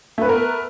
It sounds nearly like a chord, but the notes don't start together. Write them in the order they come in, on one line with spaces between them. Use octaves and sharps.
A3 B4 B3 A#4